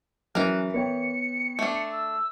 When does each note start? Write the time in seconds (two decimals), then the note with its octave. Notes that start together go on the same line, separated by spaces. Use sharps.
0.35 E3 F#3 C#4 A#4 F#6
0.74 B3 C#5 G5 C#7
1.59 A3 D4
1.91 E6